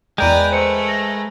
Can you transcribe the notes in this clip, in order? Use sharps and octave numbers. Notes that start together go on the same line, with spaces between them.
E2 G#3 A#4 B4 D5 G5 A#5 G6
A3 C5 C#7
A#6